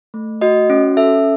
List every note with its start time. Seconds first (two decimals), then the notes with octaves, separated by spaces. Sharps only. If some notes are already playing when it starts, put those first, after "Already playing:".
0.14 A3
0.41 F#4 D#5
0.70 C#4
0.97 A4 E5